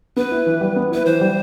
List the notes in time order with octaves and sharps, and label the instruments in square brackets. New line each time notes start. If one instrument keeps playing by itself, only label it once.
[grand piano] B3 [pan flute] B4
[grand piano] E4
E3
G3
B3
[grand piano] E4 [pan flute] B4
[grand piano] E3 [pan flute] C5
[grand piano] G3